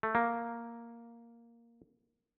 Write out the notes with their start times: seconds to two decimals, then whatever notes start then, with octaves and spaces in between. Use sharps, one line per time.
0.03 A3
0.15 A#3